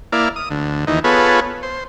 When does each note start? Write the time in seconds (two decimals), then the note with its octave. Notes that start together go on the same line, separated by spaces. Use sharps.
0.12 A#3 E4 D5 F5
0.36 D#6
0.50 D2
0.87 D#2 E3 D#4
1.04 B3 F4 G#4 A4 B4 C#5
1.63 C5